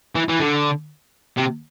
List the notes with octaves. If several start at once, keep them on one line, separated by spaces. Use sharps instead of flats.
E3
E3
D3
C3